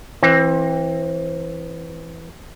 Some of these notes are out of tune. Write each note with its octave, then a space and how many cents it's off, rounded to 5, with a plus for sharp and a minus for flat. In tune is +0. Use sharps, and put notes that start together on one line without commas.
E3 +0 C4 +25